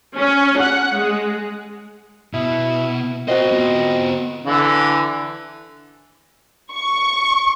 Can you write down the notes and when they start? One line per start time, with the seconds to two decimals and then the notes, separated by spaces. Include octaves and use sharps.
0.16 C#4
0.60 F#5
0.97 G#3
2.33 B2 E4
3.28 C4 F#4 A#4 C5 D#5
3.52 B3 F4
4.44 D3 E3
6.73 C#6